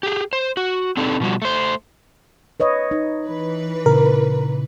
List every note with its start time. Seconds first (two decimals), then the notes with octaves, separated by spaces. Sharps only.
0.03 G4 G#4
0.33 C5
0.57 F#4
0.97 C4 D4 D#4 A4
1.20 B2 F3 G3 F#4
1.42 A3 C5
2.60 B4 C#5 D#5
2.91 D#4
3.26 E3 B4
3.86 A#2 C#3 A#4